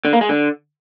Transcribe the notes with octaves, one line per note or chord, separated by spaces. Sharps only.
D3
A#3
G#3
D3